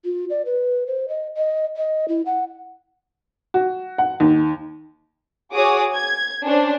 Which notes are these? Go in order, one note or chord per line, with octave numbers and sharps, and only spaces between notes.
F4
D5
B4
C5
D#5
D#5
D#5
E4
F#5
F#4
F#5
D#2
F#4 G#4 C#5 D6 D#6
G#6
C#4 D4 C5